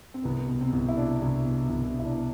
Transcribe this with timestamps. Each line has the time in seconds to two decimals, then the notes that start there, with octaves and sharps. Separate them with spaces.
0.14 C4
0.24 C2 B3
0.49 B2
0.61 C4
0.73 C2
0.89 E4
0.97 B2 D4
1.22 C2
1.45 B2
1.70 C2
1.94 B2
1.99 E4
2.05 D4